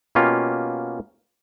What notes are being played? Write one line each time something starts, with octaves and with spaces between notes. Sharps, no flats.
B2 A#3 C#4 F4 G4